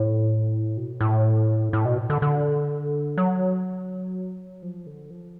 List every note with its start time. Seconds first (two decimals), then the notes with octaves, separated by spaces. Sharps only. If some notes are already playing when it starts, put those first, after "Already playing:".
Already playing: A2
0.77 B2
1.01 A2
1.73 A2
1.85 B2
2.10 D3
2.22 D3
3.18 F#3
4.62 F3
4.87 D3
5.11 F3